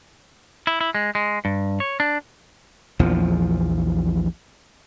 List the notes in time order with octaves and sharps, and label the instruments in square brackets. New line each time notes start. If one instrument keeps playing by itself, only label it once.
[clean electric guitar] E4
E4
G#3
G#3
G2
C#5
D4
[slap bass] A#1 E2 F3